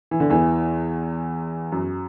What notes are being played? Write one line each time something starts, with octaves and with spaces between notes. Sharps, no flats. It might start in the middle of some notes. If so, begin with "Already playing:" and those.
E3
D3
E2 E3
F#2 F#3